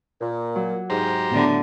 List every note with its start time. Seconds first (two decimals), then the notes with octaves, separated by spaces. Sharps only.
0.21 A#2
0.56 F#3
0.90 G#2 G4 C5 A#5
1.31 A2 D3 B3 D5